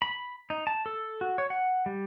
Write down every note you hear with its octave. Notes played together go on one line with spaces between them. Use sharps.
B5
D#4
A5
A4
F#4
C#5
F#5
G3